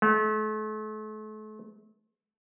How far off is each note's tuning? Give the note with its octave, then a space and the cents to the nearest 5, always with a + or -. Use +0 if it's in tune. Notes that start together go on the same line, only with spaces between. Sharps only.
A3 -35